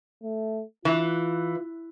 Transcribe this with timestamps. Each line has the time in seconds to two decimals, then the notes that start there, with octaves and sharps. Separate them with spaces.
0.23 A3
0.85 E3 F4